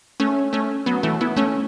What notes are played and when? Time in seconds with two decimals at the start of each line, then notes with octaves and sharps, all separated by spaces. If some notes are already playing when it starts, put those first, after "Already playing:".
0.20 A3 C#4
0.53 A3 C#4
0.86 F#3 B3
1.03 E3 A3
1.21 B3 E4
1.37 A3 C#4